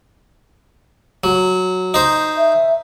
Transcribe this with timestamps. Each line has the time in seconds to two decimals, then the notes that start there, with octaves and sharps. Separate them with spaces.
1.24 F#3
1.94 D#4 C5
2.37 E5